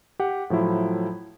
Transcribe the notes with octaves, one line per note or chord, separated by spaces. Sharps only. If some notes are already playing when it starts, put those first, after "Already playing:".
G4 F#5
A2 F3 F#3 E4